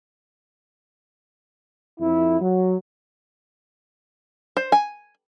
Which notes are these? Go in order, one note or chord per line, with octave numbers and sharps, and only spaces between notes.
F2 E4
F#3
C5
G#5